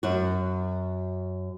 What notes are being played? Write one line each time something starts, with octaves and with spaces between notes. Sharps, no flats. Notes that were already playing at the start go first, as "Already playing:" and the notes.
F#2 F#4